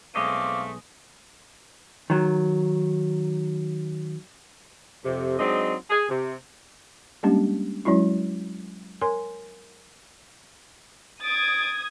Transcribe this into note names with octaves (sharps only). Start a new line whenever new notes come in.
B1 G#3 A3 C4 D#5 F5 D6
D#3 F#3
F2 C3
F#3 G#3 C4 D4 D#4 D#5
G#4
C3
G3 G#3 A#3 C#4 D4 G4
F#3 G#3 C#4 E4 F#4
A#4 C#5 G#5 C6
D#6 G#6 A6 D7